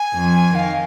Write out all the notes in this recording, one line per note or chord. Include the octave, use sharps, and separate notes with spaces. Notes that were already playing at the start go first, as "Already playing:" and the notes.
Already playing: G#5
F2
D#3 F5